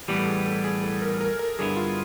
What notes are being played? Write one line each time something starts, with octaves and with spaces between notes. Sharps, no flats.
A2 E3 G3 B3 G4
A4
G#4
A4
G#4
A4
A#4
A#4
A#4
G2 D3 F#3 B3 E4 G#4
F4